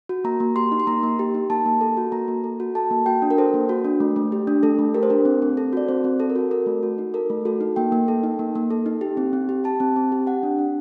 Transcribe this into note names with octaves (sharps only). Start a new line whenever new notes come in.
F#4
A#3 A#5
A#3
G4 C6
D#4
C6
A#3 A#5
A#3
G4
D#4
A#3 A5
A#3
A4
F#4
A#3 A#5
A#3
A4
F#4
A4 A5
A#3
F#4 G5
D4
A#4
A4 C5
A#3
F#4
D4
A3
A3
G4
D4
A3 A4
A3
G4 A#4
C5
D4 A#4
C4
C4
A4
F#4 D5
C4 C5
C4
A4
A#4
F#4 A4
A4 A#4
A3
F#4
D#4
A4 A#4
A3
F#4 A4
D#4
A#3 G5
A#3
A4
D#4
A#3
A#3
A4
D#4
G4
C4
C4
G4
G4 A5
C4
C4
G4
G4 F#5
D4
D4